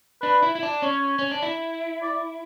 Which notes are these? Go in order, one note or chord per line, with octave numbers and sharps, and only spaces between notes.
D4 B4
E4
E4
D4
C#4 C#5
C#4
D4
E4
D5